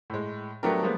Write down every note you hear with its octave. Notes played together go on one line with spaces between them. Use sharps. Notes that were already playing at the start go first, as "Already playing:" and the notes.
A2 G#3
F#3 A3 B3 D4 G4 A#4
F3 G3 G#3 A#3 B3